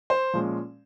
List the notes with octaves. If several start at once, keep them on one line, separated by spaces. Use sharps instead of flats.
C5
A#2 F3 G#3 C#4